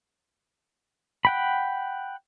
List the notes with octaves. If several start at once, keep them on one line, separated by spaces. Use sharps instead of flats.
F#5 G5 B5